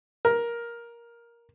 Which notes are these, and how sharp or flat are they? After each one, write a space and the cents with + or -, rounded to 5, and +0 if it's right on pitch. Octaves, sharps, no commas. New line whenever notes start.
A#4 +10